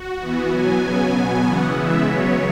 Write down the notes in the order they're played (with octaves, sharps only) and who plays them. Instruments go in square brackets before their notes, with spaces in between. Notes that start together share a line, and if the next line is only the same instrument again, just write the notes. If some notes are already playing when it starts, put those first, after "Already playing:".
Already playing: [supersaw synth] F#4
E3 B3
B2 F#3 B3 G#5
C#3 F#3 B3
B2 F#3 B3
C#3 E3 B3 F#5
C#3 E3 G#3 B3 E5
C#3 F#3 B3 C#5